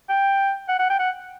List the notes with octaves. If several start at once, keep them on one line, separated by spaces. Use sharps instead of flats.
G5
F#5
F#5
G5
F#5